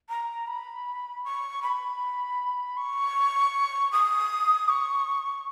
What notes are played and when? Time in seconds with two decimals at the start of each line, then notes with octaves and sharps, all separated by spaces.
0.09 A#5
0.47 B5
1.24 C#6
1.62 B5
2.77 C#6
3.92 D#6
4.69 C#6